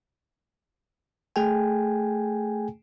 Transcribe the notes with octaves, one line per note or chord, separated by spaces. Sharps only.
A3 G#4 G5 G#5